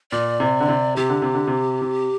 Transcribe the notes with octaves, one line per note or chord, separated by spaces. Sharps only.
A#2 D5
C3
D3
C3
C3 G4
D3
C3
D3
C3
C3